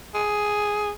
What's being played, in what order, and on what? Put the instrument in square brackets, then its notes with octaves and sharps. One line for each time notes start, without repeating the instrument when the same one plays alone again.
[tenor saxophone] G#4